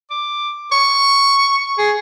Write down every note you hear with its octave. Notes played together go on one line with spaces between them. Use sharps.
D6
C#6
G#4